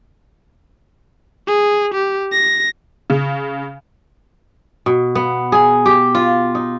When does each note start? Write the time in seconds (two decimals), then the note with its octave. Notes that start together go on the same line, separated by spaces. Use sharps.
1.47 G#4
1.94 G4
2.32 A#6
3.10 C#3
4.86 B2
5.15 B3
5.52 G#4
5.86 G4
6.15 F4
6.55 D#4